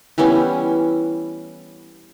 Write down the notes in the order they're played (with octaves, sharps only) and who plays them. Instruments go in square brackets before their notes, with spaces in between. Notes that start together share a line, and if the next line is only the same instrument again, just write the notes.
[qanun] E3 G3 B3 C#4